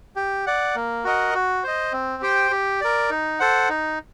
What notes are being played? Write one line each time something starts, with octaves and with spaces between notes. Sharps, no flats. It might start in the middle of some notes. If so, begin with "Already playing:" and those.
G4
D5 F#5
A#3
F#4 A#4 D#5 F#5
F#4
C5 D#5
C4
G4 C5 G5
G4
A#4 D5
D#4
A4 C5 F#5
D#4